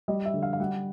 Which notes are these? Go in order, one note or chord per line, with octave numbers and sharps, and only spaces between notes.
G3 D#5
E5
D3
F5
F5
G3 F#5